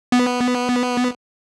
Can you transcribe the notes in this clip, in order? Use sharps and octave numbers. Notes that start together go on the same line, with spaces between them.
B3